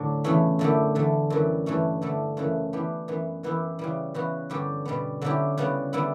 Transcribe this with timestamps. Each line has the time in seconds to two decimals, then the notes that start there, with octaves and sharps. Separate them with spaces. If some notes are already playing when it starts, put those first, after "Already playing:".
Already playing: A2 D3 F#3 D4
0.24 E2 C#3 E3 A3 C#4
0.59 F#2 D3 A3 E4 G4
0.95 E2 D3 A3
1.30 F#2 E3 G3
1.66 G2 E3 A3 C#4
2.02 G2 D3 A3
2.37 F#2 C#3 E3 A3
2.73 E3 B3 D4 G4
3.08 F#2 E3 B3
3.43 F#2 E3 B3 E4 G4
3.79 C#3 E3 G3
4.14 C#3 E3 B3 F#4
4.50 G2 D3 G3 C#4 G4
4.85 B2 G3 B3
5.22 D3 F#3 C#4 E4 G4
5.58 C#3 G3 B3 F#4
5.93 D3 G3 B3 E4